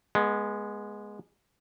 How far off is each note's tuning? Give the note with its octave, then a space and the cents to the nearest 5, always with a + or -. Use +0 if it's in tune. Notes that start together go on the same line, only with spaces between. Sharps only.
G#3 +0 B3 -25